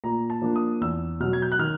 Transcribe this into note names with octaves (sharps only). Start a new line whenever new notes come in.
A#2 A#5
A5
F3 A#3 D4
D#6
E2 E6
B2 F#3 F6
G#6
G6
F#6
D#3 F6